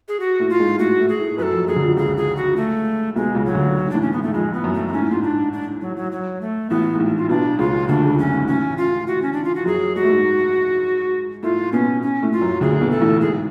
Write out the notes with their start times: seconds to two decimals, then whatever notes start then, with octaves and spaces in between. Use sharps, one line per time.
0.08 G#4
0.20 F#4
0.40 A2 A3
0.50 F4
0.60 G#2 G#3
0.79 A2 A3 F#4
0.99 A2 A3
1.09 G#4
1.19 A2 A3
1.38 F#2 F#3 A4 B4
1.53 F2 F3
1.67 F#2 F#3 G#4
1.76 D3
1.83 F2 F3
1.97 C#2 C#3 G#4
2.17 G#4
2.37 F#4
2.57 A3
3.16 B1 B2 G#3
3.35 C#2 C#3
3.46 F#3
3.55 D2 D3
3.85 G#2
3.91 A1 A2 D4
4.02 C#4
4.07 A2
4.12 G#2 B3
4.23 A3
4.34 F2 F3 G#3
4.53 B3
4.64 F#2
4.74 A3
4.88 B3
4.93 G#2 C#4
5.02 A2
5.11 G#2 F4
5.23 D4
5.53 D4
5.81 F#3
5.97 F#3
6.12 F#3
6.41 A3
6.70 A1 A2 B3
6.95 G#2
6.99 A1 A2
7.18 F4
7.29 B1 B2 D4
7.59 C#2 C#3 F4
7.88 D2 D3 D4
8.03 C#2 C#3
8.18 F#2 C#4
8.32 G#2
8.47 A1 A2 C#4
8.77 F4
9.07 F#4
9.22 C#4
9.33 D4
9.44 F4
9.55 F#4
9.60 F3
9.65 F#2 F#3 G#4
9.95 G#3 F#4
10.03 A3
10.09 G#2 G#3
11.43 A2 A3 F4
11.73 B2 B3 C#4
12.02 C#4
12.22 A2 A3
12.32 F4
12.41 F#2 F#3
12.61 D2 D3 G#4
12.81 B1 B2
12.91 A4
13.01 A1 A2
13.21 G#2 G#4